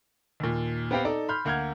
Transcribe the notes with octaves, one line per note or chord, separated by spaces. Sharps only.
D#2 A#2
B3 C4 G4 F5 G5
D#4 A4 D5
B5 C6 F6 G6
D2 A#3 F#5 F6 G6 G#6